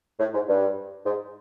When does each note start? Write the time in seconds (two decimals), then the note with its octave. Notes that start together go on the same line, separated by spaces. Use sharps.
0.19 A2
0.34 G#2
0.48 G2
1.06 G#2